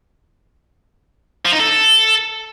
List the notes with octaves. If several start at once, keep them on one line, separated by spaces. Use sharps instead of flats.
F3
D#4
A4